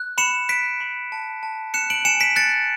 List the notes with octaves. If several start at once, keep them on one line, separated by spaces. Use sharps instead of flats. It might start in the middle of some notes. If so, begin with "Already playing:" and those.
Already playing: F#6
B5 C#7 E7
F#6 B6 D7
B5
A5
A5
F#6 C#7 E7
D7 F#7
G#5 C#7 E7
B6 D7
F#6 A6 C#7